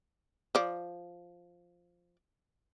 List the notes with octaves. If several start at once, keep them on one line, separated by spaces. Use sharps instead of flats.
F3 D5